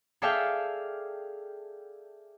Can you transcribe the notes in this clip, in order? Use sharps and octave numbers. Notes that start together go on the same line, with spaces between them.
G#4 A4 D5 E5 F5 G5